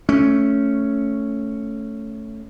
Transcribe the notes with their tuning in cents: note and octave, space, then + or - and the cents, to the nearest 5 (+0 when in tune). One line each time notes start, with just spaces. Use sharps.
A3 +0 C#4 +0